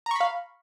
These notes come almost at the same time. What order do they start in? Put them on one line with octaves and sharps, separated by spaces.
A#5 C#6 B5 F5